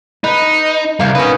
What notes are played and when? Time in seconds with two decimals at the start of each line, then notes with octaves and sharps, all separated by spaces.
0.24 D#4 B4
1.00 C2 A#3 F5
1.15 B2 C#4 D#4 B4